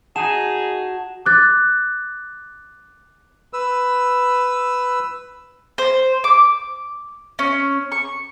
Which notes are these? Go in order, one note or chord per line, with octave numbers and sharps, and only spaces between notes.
D#4 F#4 G#4 A5 E7
D6 F#6 A6
B4 E6
C5
D6
C#4
C#6